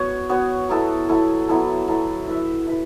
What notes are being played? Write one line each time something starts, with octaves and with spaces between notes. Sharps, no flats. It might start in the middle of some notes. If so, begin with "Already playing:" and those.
Already playing: B3 F#4 C#5
B3 F#4 C#5
F#3 B3 E4 A4
F#3 B3 E4 A4
F#3 B3 E4 A4
F#3 B3 E4 A4
E4 B4 E5
E4 B4